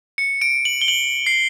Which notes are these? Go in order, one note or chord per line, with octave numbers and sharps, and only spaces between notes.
C#7
D7
F#7
G7
F#7
C7